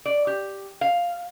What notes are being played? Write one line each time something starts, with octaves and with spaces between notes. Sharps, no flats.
D5
G4
F5